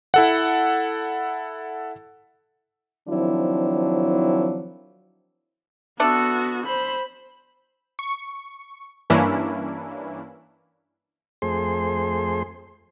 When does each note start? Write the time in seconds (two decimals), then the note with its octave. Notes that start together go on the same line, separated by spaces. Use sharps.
0.14 E4 A4 F#5
3.09 D#3 F3 F#3 C4 D4 E4
6.00 A3 B3 D4 F#4 A4
6.66 C5 B5
7.99 C#6
9.10 G2 E3 A#3 C#4 D4 E4
11.42 F2 A3 G#4 C5 C6